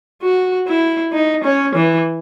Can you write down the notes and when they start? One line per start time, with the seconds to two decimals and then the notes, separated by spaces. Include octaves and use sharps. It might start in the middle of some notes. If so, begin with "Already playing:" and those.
0.22 F#4
0.68 E4
1.13 D#4
1.44 C#4
1.75 E3